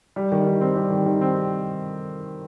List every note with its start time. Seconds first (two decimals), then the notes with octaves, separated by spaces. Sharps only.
0.16 G3
0.32 D#3
0.47 D#3
0.61 C4
0.76 G3
0.90 D#3
1.06 D#3
1.21 C4